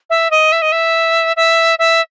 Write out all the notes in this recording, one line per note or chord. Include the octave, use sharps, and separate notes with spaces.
E5
D#5
E5
D#5
E5
E5
E5